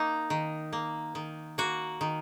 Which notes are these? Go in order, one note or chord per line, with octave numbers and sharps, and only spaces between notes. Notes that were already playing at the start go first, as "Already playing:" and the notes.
Already playing: A#3 D#4
D#3
A#3
D#3
A#3 F#4
D#3